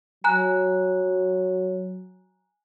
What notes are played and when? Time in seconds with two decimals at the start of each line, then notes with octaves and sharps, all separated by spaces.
0.24 F#3 G#5 A#5 F#6